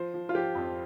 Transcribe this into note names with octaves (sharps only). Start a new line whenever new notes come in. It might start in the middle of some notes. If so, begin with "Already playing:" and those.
Already playing: F3 C5
F3
F4
F3 G4
F2